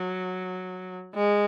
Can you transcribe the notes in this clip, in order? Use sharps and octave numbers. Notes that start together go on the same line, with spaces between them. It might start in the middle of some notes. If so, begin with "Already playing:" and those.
Already playing: F#3
G#3